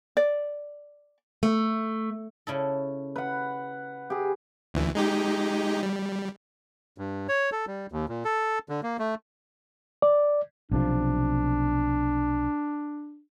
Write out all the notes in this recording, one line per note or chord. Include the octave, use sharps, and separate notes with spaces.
D5
A3
C#3 E4 A4
B4 F#5
G4 G#4
D2 E3
G#3 D#4 G4
G3
G2
C#5
A4
G3
D#2
A#2
A4
D3
A#3
A3
D5
B1 C3 F3 D4